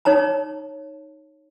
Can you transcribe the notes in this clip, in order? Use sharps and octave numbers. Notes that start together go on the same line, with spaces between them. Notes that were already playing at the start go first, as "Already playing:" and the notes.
D#4 C#5 A5 A#5